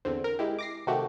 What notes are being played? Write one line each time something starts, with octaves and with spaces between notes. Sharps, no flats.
E2 D3 C4
A#4
G#3 E4 G4
D6 A#6 C7
C3 D#3 A3 F#4 G4